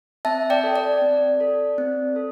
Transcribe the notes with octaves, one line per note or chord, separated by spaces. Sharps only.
C4 E5 A5
D5 G5
A4
D5
C4
A4
C4
A4